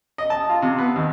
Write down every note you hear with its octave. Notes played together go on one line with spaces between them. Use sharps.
D#5
A5
F4
C3
B3
D#2